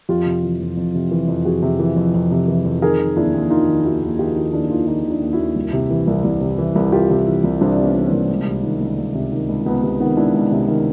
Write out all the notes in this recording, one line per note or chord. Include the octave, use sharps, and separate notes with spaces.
F2 F4 G4
C3
E3
F2
F2
C3
E3
F2
F2 F#4 G#4
C3
E3
F2
F2
C3
E3
F2
D#3 G#4 A#4
D#3
D#2 D4 E4
D#2
D#3 D#4 F4
D#3
D#2 E4 F#4
D#2
D#3 F4 G4
D#3 E4 F#4
D#2 D4 E4
D#2 D#4 F4
D#3 D#4 F4
D#3
D4 E4
D#2
E4 F#4
D#2
C2
C3
E3
C2
C2
C3
E3
C2
C2 F4 G4
C3
E3
C2
C2 C4 D4
C3
B3 C#4
E3
A#3 C4
C2
C#2
C3
D#3
C#2
C#2
C3
D#3
C#2
C#2 B3
C3 B3
D#3 B3
C#2 D4 E4
C#2
C3
D#3